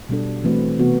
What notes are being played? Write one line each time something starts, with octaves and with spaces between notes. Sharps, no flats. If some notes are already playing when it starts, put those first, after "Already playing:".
B2 G3 D4 A4
E3 A3 C4 F#4 B4
C3 E3 B3 F#4